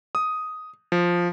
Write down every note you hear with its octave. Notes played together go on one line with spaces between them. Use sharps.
D#6
F3